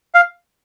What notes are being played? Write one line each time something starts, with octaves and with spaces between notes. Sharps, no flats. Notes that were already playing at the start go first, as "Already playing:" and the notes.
F5